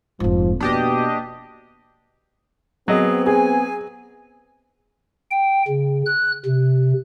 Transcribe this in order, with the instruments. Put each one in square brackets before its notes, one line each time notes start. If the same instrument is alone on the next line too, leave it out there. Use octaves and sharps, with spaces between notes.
[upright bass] F1 G#2 [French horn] F3
[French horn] B2 [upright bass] A#3 [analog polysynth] D4 G4 D#5
[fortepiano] F#3 D#5 [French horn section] B3 C4 [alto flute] G#4
[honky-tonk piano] G#4 [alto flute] G#5
[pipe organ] G5
C#3
F#6
C3